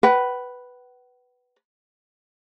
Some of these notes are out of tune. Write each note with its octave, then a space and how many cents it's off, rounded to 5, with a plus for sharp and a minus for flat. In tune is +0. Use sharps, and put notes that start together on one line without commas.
B4 +0 F#5 +45